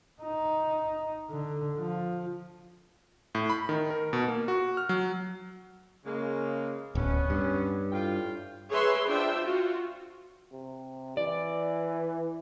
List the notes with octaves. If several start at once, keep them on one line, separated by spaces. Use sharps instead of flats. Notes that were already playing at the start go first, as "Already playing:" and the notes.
D#4
D3
F3
A2
B5
D#3
A#4
B2
A#3
F#4
F6
F#3
C#3 G#3 A#3
D1 B3 C#4
G2
A2 F4 G5
G#4 B4 C#5 E5 B5 C6
D4 F4 C5 E5 G5
F4 F#4
C3
E3 D5